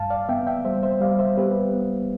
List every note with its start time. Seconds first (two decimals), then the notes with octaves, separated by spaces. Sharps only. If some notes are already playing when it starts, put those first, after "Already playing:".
Already playing: G2 F5 A5
0.10 D5 F5
0.29 B3 E5 G5
0.47 E5 G5
0.65 G3 C5 E5
0.83 C5 E5
1.01 G3 D5 F5
1.19 C5 E5
1.37 B3 G4 B4
1.74 B3